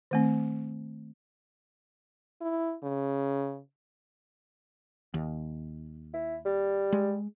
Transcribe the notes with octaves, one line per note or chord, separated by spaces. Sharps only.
D#3 A3 C4
E4
C#3
D#2
E4
G3
G#3